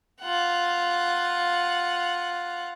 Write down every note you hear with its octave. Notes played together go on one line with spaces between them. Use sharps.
F4 F#5